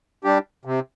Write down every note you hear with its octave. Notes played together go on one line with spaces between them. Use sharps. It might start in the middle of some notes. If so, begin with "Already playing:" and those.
G3 D4 G4
C3